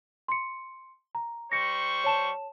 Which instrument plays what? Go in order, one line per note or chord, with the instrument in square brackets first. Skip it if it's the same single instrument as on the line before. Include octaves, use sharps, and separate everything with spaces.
[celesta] C6 C#7
A#5
[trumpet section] G3 C5 C#6 [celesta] A#6 C#7
[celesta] C#5 A5 E7